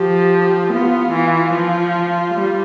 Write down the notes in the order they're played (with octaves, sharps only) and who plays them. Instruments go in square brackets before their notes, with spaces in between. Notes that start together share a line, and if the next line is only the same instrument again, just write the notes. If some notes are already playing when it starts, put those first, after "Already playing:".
Already playing: [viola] F3 [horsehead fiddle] G4
[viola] B3 [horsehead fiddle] F4
[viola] E3
F3
G3